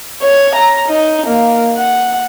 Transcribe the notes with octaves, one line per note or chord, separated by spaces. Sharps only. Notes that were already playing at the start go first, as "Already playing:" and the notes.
C#5
A#5
D#4
A#3
F#5